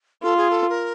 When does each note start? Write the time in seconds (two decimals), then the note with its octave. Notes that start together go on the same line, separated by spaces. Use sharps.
0.23 F4 A4
0.37 G#4
0.50 A4
0.70 A#4